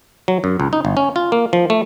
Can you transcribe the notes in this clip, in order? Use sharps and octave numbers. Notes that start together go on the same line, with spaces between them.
F#3
F#2
C#2
D#4
G1
C#4
F4
A#3
F3
A3